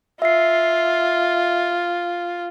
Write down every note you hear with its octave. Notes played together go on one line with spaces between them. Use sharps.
F4 E5 C7